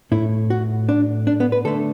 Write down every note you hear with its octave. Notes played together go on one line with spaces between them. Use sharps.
A2 A3 E4
F#4
D4
D4
B3
B4
D3 A3 A4